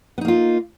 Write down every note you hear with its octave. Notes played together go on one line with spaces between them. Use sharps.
A#3 B3 D#4 F4